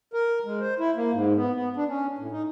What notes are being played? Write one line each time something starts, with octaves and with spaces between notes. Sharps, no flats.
A#4
G#3
C5
E4
A#3
G#2
B3
B3
D4
C#4
A2
D#4